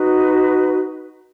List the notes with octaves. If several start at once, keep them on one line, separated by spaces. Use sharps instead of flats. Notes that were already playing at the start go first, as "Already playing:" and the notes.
Already playing: D#4 F#4 B4